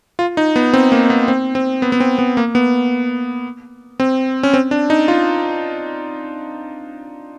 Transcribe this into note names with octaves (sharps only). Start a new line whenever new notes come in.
F4
D#4
B3
C4
A#3
B3
C4
C4
B3
B3
C4
B3
A#3
B3
C4
C#4
C4
D4
D#4
F4